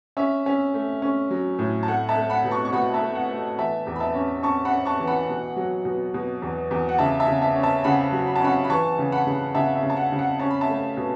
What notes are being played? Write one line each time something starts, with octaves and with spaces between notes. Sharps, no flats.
C#4 E5
C#4
A3
C#4
F#3
A2
A5
A3 F#5
E5 A5
A3
F#5 B5
B2
A5 C#6
C#6
B2 F#5 B5
E5 A5
A3
F#5
A3
E3 E5 A5
E2
B5
E5 A5
C#4
C#4 A5 C#6
F#5 B5
C#4
A5 C#6
E3
F#5 B5
B2
F#3
B2
B2
E2
E2
F#5
C#3 E5 A5
E5 A5
C#3
E5 A5
C#4
E5 A5
C#3 F#5 B5
F#3
B5
A5
C#4 F#5 B5
B5
E3 A5 C#6
C#3
F#5 B5
C#3
C#3 E5 A5
E5
C#3
A5
F#5
C#3
F#5
C#4 A5
B5
E5 A5
A3
B2